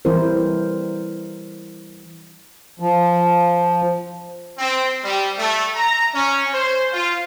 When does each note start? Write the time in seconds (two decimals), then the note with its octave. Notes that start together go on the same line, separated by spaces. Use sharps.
0.05 E3 G3 C4 E4 A#4 C5
2.80 F3
4.58 C4
5.04 G3
5.38 A3
5.75 A#5
6.14 C#4
6.53 C5
6.92 F4